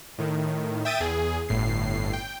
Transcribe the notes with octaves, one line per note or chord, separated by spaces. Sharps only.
A2 D#3
E5 G5 D#6 A6 D#7
E2 G#4
G1 A2 C7
G5